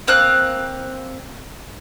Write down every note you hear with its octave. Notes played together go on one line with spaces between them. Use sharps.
A#3 C4 F5 F#6